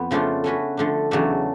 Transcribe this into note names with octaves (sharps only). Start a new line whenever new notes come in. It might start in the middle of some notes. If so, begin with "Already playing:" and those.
Already playing: F2 B3
C#3 F3 A3 D4 F4
A3 C#4 F#4 B4
D3 F3 A3 D4
E2 C#3 F#3 A3 D4